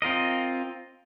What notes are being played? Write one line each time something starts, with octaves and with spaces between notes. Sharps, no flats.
C4 F4 A#4 D#5